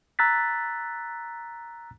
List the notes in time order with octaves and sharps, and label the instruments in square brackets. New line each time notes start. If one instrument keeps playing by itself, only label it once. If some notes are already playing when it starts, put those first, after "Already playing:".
[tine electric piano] A#5 E6 F#6 A6 B6